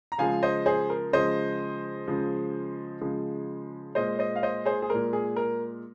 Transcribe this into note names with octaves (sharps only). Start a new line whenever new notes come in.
A#5
C#3 F3 G#3 F5 G#5
C5 D#5
G#4 C5
A#4
C#3 F3 G#3 C5 D#5
C#3 F3 G#3
C#3 F3 G#3
A#2 G#3 C5 D#5
C5 D#5
F5
C5 D#5
G#4 C5
G#4
A#2 G#3 A#4
G#4
A#4